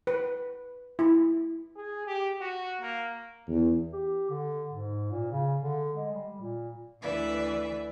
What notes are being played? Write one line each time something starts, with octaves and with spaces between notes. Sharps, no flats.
B4
E4
G#4
G4
F#4
A#3
E2
G4
D3
G#2
A#2
C#3
D3
G#3
G3
A#2
D2 E3 B4 D5 E5